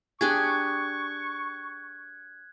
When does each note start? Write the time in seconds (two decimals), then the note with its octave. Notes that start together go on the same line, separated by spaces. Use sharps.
0.21 D4 G4 G#4 C#6 F#6 G#6